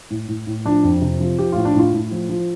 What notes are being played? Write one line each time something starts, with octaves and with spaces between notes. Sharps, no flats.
A2
A2
A2
F3 D4
F2
C3
F3
F3 G4
A2 F4
D4
A2 F4
A2
F3
F3